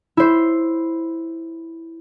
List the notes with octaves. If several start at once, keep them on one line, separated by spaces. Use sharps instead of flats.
E4 C5